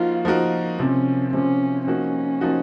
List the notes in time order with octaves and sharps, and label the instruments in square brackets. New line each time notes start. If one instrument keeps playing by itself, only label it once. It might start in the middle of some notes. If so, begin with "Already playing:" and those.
Already playing: [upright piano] F3 A#3 D#4 F#4 A#4 [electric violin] F4
[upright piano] F3 A#3 D#4 F#4 A#4
[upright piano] C3 F3 C4 [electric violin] C#4
[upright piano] C3 F3 C4 [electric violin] C#4
[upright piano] F3 A#3 D#4 F#4 [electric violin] C#4
[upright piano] F3 A#3 D#4 F#4